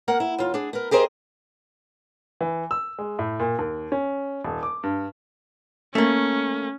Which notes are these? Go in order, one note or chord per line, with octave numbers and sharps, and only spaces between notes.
A#3 A#4 F#5
E4
D#2 F4
D4 G#4
B3 A#4
G4 G#4 A#4 C5 D#5
E3
E6
G#3
A2
A#2
D#2
C#4
D#1
D6
G2
A3 A#3 C#4